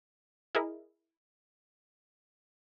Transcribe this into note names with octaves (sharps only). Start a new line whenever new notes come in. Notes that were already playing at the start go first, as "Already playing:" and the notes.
E4 G#4 A#4 D#5